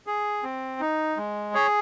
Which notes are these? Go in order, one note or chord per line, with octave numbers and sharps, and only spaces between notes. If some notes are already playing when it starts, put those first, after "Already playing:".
G#4
C4
D#4
G#3
G#4 C#5